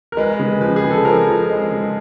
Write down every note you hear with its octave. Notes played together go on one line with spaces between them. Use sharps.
A#4
G#3 B4
C#3
F3 B4
G#4
C#3
A4
F3 A#4
F3
G#3
C#3